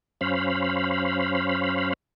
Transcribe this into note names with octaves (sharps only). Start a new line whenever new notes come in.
F#2 C#4 C5 F5 B5